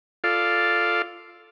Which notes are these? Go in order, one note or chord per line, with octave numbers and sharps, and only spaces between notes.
F4 A4 D5 F5